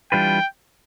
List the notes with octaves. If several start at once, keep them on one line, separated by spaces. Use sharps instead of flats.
E3 G3 D4 F4 B4 G5